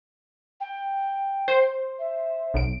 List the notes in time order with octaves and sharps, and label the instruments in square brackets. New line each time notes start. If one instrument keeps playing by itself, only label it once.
[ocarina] G5
[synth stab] C5
[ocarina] E5
[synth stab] B1 D7